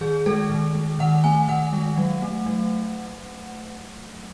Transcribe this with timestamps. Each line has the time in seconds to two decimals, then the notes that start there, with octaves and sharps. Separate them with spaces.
0.01 D#3 G#4
0.26 G#3 A4
0.50 D#3
0.75 G#3
0.99 D#3 F#5
1.24 A3 G#5
1.48 D#3 F#5
1.73 G#3
1.97 F#3
2.22 A3
2.46 F#3